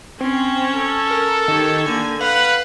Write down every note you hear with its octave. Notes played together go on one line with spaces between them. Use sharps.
C4 C#4
A4
A#4
D#3 G4 C#5
D3 A#3 G#5
B4 F5 F#5